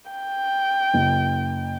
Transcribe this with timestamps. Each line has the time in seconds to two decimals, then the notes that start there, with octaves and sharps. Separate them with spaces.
0.11 G5
0.94 F#1